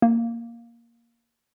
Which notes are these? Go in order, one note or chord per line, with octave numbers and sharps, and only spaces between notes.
A#3